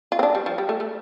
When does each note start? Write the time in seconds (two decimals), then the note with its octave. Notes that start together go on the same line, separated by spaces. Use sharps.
0.12 F4
0.19 C4
0.23 D4
0.35 G3
0.46 F3
0.58 G3
0.69 A3
0.80 A3